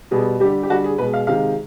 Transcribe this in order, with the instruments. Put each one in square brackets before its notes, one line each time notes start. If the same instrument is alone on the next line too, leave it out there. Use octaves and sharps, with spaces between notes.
[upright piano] B2 G3 G#4
D3 G3 G4
G4
D3 G3 F#4
G#4
B2 G#3 B4
F5
C3 D#3 G#3 F5